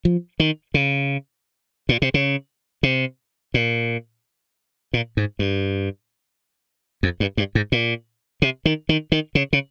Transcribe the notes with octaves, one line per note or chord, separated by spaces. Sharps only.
F3
D#3
C#3
A#2
C3
C#3
C3
A#2
A#2
G#2
G2
F2
G2
G2
G#2
A#2
C3
D#3
D#3
D#3
C#3
C#3